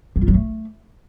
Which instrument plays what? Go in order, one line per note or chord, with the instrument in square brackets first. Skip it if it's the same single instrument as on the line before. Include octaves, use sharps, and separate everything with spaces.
[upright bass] F#3
F4
F#3
A3